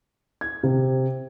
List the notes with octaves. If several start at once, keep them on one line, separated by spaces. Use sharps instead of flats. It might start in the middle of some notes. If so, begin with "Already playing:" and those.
G#6
C3